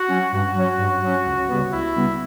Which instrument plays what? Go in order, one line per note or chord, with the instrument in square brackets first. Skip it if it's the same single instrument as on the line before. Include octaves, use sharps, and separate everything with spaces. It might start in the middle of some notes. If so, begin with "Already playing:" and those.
Already playing: [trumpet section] F#4
[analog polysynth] F#3 C#4
[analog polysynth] G2 [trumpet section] F#4
[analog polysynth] F#3 C#4
G2
F#3 C#4
C#2
C#3 G3 B3
[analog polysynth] C#2 [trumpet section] E4
[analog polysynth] C#3 G3 B3